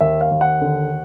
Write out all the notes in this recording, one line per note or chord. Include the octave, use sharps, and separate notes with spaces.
D#2 E5
F5
D#2
F#5
D3